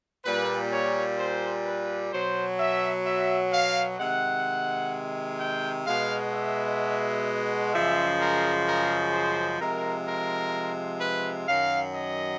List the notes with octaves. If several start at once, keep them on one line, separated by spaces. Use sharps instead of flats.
A#2 G3 B4
C#5
C5
B4
B2 F#3 C5
E5
E5
F5
C3 D#3 G#3 F#5
G5
B2 G#3 F5
E5
F#2 C#3 F3 G#3 E5
A#4
A#4
C5
C3 F3 G#3 A#4
A#4
B4
F#2 D#3 F#3 F5
D#5